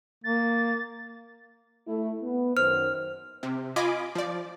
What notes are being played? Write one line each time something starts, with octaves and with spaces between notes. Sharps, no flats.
A#3 A6
A3 E4
B3
F#2 D#3 C5 F6
C3
F4 D#5 G#5 B5 D6
F3 D5